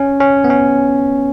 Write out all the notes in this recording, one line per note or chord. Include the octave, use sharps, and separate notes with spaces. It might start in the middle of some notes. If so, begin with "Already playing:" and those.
Already playing: C#4
C#4
B3
C#4